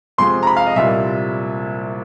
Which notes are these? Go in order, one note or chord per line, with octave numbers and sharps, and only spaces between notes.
F2 C3 F3 G#3 C6
A#5
B5
F5
D#5
C2 A#2 G3 A#3 E5